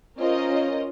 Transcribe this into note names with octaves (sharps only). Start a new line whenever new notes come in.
C#4 F4 A#4 C5 D#5